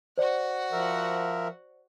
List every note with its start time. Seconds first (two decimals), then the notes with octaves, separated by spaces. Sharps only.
0.18 F#4 C5 D5 F#5
0.72 F3 A#4 E5